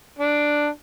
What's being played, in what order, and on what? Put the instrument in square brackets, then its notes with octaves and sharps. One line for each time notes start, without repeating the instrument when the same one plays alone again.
[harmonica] D4